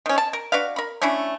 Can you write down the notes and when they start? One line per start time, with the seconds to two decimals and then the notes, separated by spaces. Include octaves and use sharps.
0.06 D#3 C#4
0.18 A5
0.33 A#4
0.52 D4 F#4 B4 F5
0.76 A#4 B5
1.02 A3 C#4 D4 E4